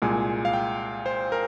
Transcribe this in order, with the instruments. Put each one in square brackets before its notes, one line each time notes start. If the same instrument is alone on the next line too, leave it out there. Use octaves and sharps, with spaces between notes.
[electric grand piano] C2 A#2 G#3 G#5
F5
G5
C5
A#4